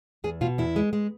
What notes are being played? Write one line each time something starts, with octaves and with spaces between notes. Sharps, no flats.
E2 G#4
B2 F4
E2 E4
G#3
G#3